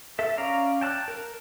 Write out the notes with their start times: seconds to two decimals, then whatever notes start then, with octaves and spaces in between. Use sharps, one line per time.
0.19 A4 E5
0.37 C#4 D5 F5 A#5
0.81 G5 A5 F6 F#6
1.08 A#4